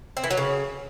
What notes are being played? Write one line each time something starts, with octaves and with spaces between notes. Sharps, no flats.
C4
E3
F#3
C#3